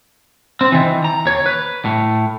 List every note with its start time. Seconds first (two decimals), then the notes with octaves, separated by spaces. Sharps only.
0.61 C4
0.72 D#3 E3
1.04 A#5
1.26 D#2 C#5
1.46 B4
1.85 A2